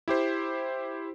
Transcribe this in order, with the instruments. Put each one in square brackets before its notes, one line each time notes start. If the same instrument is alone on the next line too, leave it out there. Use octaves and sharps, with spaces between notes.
[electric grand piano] E4 G4 C5